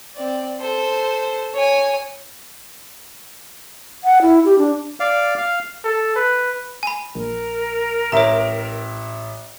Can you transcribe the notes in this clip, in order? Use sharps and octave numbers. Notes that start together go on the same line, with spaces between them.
C4 D5
A4 C5
C#5 G#5
F#5
E4
G4
D4
D5 F5
F5
A4
B4
G#5 B5
A#1 A#4
A1 C#5 E5 A#5